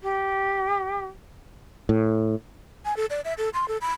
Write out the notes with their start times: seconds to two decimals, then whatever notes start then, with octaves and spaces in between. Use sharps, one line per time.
0.02 G4
1.89 A2
2.85 G#5
2.97 A4
3.10 D5
3.25 E5
3.38 A4
3.54 C6
3.68 A4
3.81 B5